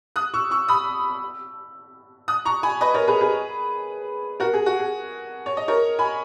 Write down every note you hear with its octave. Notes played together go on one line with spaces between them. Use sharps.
D#6 F#6
C#6 E6
C#6 E6
B5 D#6
D#6 F#6
A#5 C#6
G#5 B5
B4 D#5
A#4 C#5
G#4 B4
G#4 B4
F#4 A#4
G#4
F#4
G#4
C#5
D#5
A#4 C#5
G#5 B5